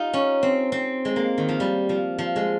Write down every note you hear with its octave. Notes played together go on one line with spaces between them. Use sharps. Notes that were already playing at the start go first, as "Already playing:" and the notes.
Already playing: D#4 F4 G4
C#4
C4
C4
G#3
A#3
D#3
F3
G3
F3
F3
G#3